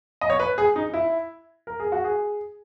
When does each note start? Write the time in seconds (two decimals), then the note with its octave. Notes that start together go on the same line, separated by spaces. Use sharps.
0.21 D#5
0.30 C#5
0.40 B4
0.58 G#4
0.76 D#4
0.94 E4
1.67 A#4
1.80 G#4
1.92 F#4
2.04 G#4